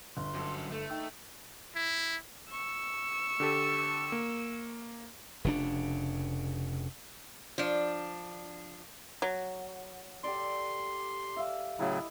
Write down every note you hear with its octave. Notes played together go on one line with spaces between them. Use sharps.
G1 C6
F#2 A4
A3 A4
D#4 G5 E6
E4
C#6 E6
D3 G4 A4
A#3
F1 C#3 D4
F3 D4
F#3
G4 A4 D5 C6
E5 F5
A2 C#3 F#3 E4 D#5